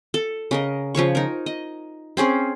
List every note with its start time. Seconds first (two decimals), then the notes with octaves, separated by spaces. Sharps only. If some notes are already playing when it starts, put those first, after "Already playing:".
0.14 A4
0.51 C#3 A#4 D#5
0.95 C#3 F3 C#5 C#6
1.15 D#4 A#4
1.46 D#5
2.17 C4 C#4 G#4 C5